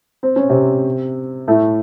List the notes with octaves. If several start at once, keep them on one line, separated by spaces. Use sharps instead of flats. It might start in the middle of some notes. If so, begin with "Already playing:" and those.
C4
C#4
C3 C4
A2 A3